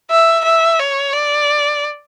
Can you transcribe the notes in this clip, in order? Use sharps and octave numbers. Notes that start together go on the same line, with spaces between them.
E5
E5
C#5
D5